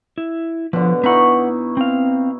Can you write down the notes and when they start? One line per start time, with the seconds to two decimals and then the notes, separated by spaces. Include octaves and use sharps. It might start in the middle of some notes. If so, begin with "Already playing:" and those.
0.18 E4
0.73 B2 D3 F3
1.03 B3 D#4 E4 F#5 C#6
1.77 C4 F5